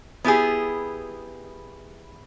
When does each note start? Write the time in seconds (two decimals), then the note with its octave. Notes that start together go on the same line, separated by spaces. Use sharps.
0.24 B3 E4 G4 G#4